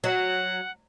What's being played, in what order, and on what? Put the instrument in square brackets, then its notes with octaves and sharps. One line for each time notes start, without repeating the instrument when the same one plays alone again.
[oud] F#3 [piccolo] F#5